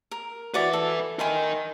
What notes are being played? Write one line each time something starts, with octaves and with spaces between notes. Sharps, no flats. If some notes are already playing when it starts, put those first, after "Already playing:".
A#4
F#4 B4 D5 E5 C#6
A4
A#4 D#5 G#5 B5 C6